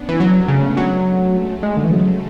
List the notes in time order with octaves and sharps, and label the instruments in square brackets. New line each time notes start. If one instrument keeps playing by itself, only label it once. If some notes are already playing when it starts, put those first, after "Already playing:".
Already playing: [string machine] B3 C#4 D4
[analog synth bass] E3
[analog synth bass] F#3 [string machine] A3
[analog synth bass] C#3 [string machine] G#3
[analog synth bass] F#3 [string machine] G#3
[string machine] A3
G#3
[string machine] C#3 [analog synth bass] G#3
[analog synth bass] D3
E3
F#3